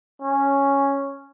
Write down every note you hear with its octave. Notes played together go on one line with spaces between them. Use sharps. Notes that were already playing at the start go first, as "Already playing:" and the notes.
C#4